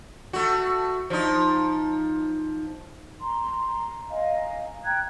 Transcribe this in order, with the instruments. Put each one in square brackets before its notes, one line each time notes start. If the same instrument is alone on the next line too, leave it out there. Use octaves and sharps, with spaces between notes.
[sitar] A3 F#4
F3 D#4
[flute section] A#5 C6
D#5 F5 G#5 A#5
G5 A#5 F#6 G#6